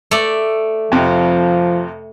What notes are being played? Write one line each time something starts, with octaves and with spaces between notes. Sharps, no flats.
A3 D5
F2 C3 F3